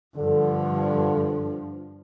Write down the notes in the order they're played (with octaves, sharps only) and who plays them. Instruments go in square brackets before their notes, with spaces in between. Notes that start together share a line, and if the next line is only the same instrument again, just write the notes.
[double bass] G2 F3 [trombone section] D3